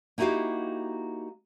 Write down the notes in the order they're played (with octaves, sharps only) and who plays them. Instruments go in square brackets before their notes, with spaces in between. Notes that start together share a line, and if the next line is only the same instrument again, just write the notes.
[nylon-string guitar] A#3 D#4 E4 F#4 G4 F5